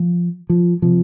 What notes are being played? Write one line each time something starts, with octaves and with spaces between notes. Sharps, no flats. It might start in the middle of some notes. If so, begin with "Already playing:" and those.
Already playing: F3
F3
C3 F3